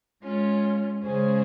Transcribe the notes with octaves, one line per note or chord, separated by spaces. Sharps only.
G#3 C#4 F4
C#3 G#3 C#4 G#4 C5